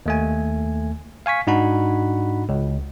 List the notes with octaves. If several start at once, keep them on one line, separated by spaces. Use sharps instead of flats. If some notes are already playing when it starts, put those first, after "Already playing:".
D#2 A3 G#5
F5 G#5 C#6 B6
G#2 D4 D#4 F#4 F#5 B5
C#2